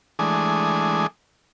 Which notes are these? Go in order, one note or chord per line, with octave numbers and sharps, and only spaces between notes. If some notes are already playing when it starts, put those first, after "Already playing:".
E3 G#3 A3 D4 G#5 D#6